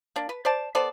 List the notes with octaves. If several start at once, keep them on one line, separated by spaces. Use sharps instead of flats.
A#3 D4
B4
C5 D5 A5
B3 A4 C5 D5